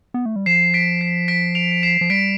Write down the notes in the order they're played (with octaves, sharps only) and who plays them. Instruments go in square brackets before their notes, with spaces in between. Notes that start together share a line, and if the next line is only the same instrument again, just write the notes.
[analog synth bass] B3
A3
G3
[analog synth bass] F3 [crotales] C7 E7
[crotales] B6 D7
C7
B6 D7
D7 F7
D7
C7 E7
[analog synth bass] F3
[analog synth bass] G3 [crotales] B6 D7